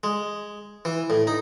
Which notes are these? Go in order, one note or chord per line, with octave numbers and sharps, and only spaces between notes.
G#3
E3
A2
D#4